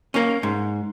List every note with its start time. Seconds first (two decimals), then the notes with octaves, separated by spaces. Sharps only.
0.14 A#3 C#4
0.43 G#2